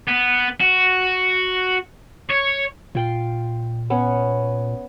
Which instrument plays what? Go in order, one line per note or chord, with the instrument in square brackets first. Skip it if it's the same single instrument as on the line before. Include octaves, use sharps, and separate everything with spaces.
[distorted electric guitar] B3
F#4
C#5
[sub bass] A#2 [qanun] F4 G5 C6
[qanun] B3 C#4